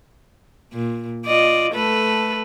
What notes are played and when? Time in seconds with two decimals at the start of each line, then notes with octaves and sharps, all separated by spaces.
0.73 A#2
1.25 F4 D5 D#5
1.73 A3 A4 B4